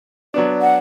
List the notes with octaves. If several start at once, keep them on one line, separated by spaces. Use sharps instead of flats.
F#3 B3 D4 D5
F#5